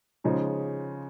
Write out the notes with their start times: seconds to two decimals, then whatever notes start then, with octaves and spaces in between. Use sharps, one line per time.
0.24 C#3 F3 G#3 D#4